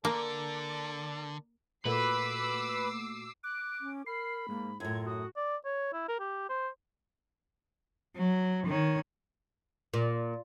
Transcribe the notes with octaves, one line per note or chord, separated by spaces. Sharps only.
D3 A#3 A4 A#4 D5
A#2 A3 F#4 B4 D6 E6 C7
D6 F#6
C#4
A#4 B5 C7
G#2 A#3
F#2 A2 F4 G#6
F#4 D#6
D5
C#5
E4
A#4
G4
C5
F#3
D#3 C#5
A#2